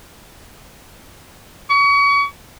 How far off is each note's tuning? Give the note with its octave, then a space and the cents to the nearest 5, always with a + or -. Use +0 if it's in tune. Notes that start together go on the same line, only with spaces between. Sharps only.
C#6 +35